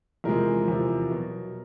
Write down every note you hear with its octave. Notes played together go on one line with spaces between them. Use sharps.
E2 C3 F3 G#3 A#4
E2 C3 F3
B2 F#3